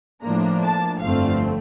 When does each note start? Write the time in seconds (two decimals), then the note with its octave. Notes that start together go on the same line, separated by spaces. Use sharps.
0.23 A2 F3 A#3 D4 A#5
0.63 A5
1.02 G1 F2 D3 A3 C4 F5